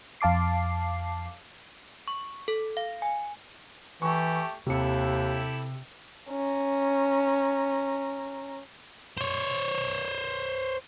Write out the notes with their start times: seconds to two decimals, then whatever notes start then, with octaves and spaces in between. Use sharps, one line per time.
0.21 F2 F5 A5 D6 C7
2.08 C#6
2.48 A4
2.77 F5
3.02 G#5
4.02 E3 A3 G4 C#6
4.67 D#2 C3 E4 G4 A4 C#7
6.30 C#4 A#5
9.17 C5 C#5